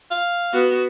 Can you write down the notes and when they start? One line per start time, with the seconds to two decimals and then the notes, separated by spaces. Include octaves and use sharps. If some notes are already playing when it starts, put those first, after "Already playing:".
0.11 F5
0.53 B3 F#4